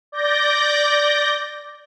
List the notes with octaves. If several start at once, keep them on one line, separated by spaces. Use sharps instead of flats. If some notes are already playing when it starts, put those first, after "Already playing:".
D5 G6 A#6